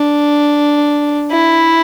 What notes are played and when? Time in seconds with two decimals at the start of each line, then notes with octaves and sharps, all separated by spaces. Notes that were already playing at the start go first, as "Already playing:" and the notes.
Already playing: D4
1.31 E4